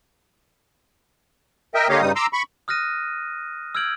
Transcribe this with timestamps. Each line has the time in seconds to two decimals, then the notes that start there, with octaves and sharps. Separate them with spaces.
1.75 A#4 D#5 E5 G5
1.89 D3 A#3 G4 C#5 D#5 F5
2.01 G2 C#3 G3 D#4 D#6
2.16 A#5 C6 D6 E6
2.33 B5 C#6
2.68 D#6 F6 F#6 A#6 D#7
3.75 E6 F6 G6 G#6 D7 F#7